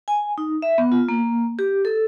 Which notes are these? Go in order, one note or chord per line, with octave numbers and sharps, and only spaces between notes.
G#5
D#4
E5
B3
F4
A#3
G4
A4